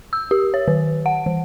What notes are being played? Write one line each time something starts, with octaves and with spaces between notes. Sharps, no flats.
E6
G4
C#5
D#3
F#5
E3